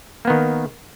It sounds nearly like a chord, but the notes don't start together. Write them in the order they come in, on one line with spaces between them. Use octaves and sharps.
A#3 B3 D#3